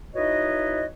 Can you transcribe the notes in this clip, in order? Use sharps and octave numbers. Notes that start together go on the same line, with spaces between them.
D#4 E4 F#4 B4 C#5 D#5